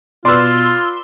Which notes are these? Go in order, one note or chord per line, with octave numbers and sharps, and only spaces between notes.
B2 F4 B4 D5 C6 E6